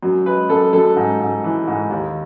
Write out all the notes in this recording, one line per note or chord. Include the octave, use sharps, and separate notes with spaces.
F#2
G#3 B4
F#2 A4
F#2 A4
G#2
G#2
E3
G#2
D#2